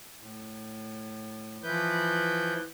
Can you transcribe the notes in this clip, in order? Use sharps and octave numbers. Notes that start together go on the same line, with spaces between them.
A2
E3 F3 E4 B4 G6